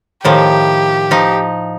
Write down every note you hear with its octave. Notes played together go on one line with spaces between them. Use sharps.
A2 D#3 F3 G4
F3 D#4